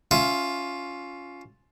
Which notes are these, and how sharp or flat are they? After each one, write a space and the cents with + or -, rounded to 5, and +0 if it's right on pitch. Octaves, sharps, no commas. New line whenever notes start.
C#4 +15 F4 +10 E5 +30